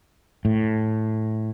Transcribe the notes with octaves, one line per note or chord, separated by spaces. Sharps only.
A2